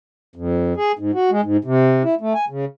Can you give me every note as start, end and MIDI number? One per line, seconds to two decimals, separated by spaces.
0.36 0.73 41
0.77 0.92 68
0.99 1.11 44
1.14 1.30 66
1.31 1.41 56
1.43 1.57 44
1.65 2.03 48
2.04 2.15 64
2.21 2.33 57
2.34 2.45 80
2.50 2.65 49